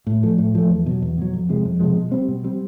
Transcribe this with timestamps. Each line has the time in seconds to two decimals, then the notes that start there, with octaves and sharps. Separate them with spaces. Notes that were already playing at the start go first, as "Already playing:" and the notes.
0.07 A2
0.23 F3 A3
0.38 A2
0.55 F3 A3
0.70 E2
0.86 B2 F#3
1.02 E2
1.18 B2 F#3
1.33 F2
1.49 C3 F3 G#3
1.65 F2
1.80 C3 F3 G#3
1.96 B2
2.12 G3 C4
2.28 B2
2.44 G3 C4